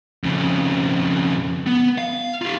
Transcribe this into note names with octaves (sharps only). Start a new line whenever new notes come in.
F2 C#3
B3
F5
F4 G4